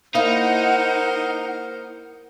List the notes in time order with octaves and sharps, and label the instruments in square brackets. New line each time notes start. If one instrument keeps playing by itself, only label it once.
[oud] A#3 E4 F5 [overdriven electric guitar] D#4 [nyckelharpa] A#4 C5 [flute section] F#5